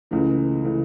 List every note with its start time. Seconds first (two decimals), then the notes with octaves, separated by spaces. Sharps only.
0.11 C#2 C#3 E3 A3
0.64 C#3 E3 A3